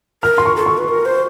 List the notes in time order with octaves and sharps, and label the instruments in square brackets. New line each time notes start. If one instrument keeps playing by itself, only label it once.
[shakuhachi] A#4 [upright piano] F6
[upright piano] C6
C#6
[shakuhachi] A4
[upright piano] C#6
[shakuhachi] B4
A#4
C5